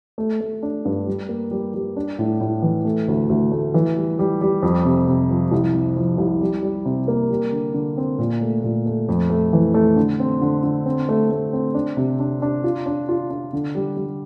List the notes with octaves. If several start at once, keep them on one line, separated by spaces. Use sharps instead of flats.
A3
A3
D4
G2
G3
A#3
G3
G3
D4
A2
A2
E3
A3
D2
D2
A3
E3
G3
G3
G3
F2
C3
C3
F3
C2
C3
F3
C2
G3
G3
C3
A#3
G3
D3
D3
C4
A#2
A3
A#2
A3
F2
A3
E3
A3
D3
C4
D3
D3
C4
A3
A3
C4
D4
C3
D4
D4
F4
D4
F4
D4
D3
G3
G3